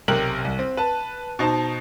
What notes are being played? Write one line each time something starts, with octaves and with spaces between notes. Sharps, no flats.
B1 C3 A#4 G5 F#6 F#7
C2
C4
B4 A5
B2 D#4 C5 A5